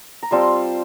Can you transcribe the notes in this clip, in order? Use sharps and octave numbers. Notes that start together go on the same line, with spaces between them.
A#5
G3 C4 F4 A5 C6